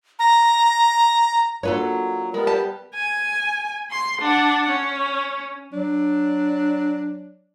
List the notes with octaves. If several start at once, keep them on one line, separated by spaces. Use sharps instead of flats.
A#5
F#3 A#3 D4 F4 A4 B4 C#5
G3 G#3 B3 A#4
G4 A5
G#5
C6
D4 F#5
C#4
F#3 D4